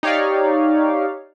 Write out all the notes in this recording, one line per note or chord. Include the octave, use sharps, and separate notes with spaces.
D#4 G4 C#5 D5 F5